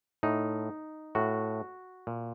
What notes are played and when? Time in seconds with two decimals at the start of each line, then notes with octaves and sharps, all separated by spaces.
0.23 A2 D#4
1.15 A2 F#4
2.07 A#2